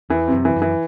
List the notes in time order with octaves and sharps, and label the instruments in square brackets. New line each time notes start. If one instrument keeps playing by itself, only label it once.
[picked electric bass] E2 [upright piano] E3
[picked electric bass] F#2 [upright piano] C3
[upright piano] E3
[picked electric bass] F#2
[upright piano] E3